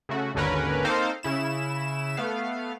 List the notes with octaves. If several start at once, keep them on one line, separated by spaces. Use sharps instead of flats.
C#3 A3 F#4
G#1 D#2 D3 C#4 A#4 B4
A#3 C4 D#4 A4 C5 F5
C#3 E4 E7
A3 B3 F5